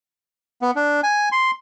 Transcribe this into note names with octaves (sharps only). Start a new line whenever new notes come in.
B3
D4
G#5
C6